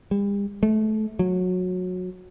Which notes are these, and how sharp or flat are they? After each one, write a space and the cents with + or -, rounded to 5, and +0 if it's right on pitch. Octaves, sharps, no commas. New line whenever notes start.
G3 +45
A3 -25
F#3 -20